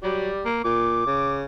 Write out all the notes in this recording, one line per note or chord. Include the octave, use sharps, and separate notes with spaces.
F#3 G3 D5
A#3
A#2 D6
C#3